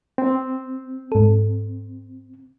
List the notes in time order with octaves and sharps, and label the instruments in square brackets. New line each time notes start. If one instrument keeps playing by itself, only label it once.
[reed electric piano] C4
[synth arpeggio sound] G#2 A4